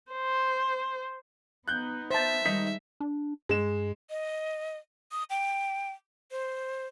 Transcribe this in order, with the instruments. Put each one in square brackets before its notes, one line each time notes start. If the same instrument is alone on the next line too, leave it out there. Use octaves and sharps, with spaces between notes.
[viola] C5
[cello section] B3 D#4 [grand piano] F#6 G6
[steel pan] C5 A5 [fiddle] E5
[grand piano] D#3 D#4 B6 [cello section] G3 G#3
[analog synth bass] D4
[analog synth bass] G2 [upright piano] G#3 E7
[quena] D#5
D#6
G5
C5